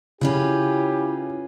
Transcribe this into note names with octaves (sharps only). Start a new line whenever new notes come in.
C#3 C#4 E4 F4 G4 B4